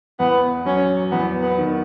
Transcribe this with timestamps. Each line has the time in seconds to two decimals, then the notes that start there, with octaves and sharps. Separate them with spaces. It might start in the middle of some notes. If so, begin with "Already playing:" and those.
0.20 E2 B3
0.65 F#3 C#4
1.12 E2 B3
1.43 B3
1.58 D#3